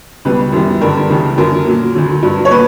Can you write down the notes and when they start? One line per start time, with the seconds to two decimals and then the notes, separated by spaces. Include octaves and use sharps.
0.25 C#2 B2 G3 B4
0.53 F#2 E3 G3
0.81 G2 D3 G3 A#4
1.10 C#2 C#3 E3 G3
1.38 F#2 D3 F#3 A#4
1.66 A#2 F#3
1.95 D2 D3 F#3
2.22 G2 F#3
2.45 C#5
2.50 A#2 B4